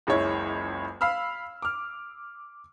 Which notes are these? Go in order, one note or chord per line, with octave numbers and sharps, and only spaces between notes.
F#1 C#2 G#3 E4 C#5
F5 B5 E6 F6
D6 F6